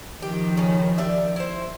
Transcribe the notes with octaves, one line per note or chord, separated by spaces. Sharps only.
D#3 F3 G4
C#3 C#4
G4 D5 E5
E4 C5